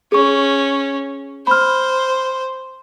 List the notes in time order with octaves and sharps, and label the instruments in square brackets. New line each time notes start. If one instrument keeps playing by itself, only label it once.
[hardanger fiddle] C#4 [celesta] G#4 C#6
[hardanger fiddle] C5 [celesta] B5 F6